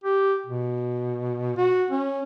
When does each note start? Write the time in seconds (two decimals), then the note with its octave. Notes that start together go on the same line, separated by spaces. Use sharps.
0.04 G4
0.46 B2
1.57 F#4
1.91 C#4